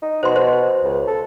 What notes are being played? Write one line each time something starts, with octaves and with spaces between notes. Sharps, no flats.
D#4
B2 C5 C6
C5
C#2
A4